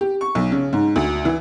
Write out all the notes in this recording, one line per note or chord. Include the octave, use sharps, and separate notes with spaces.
G4
C#6
B1
C#3
G#2
D2
E3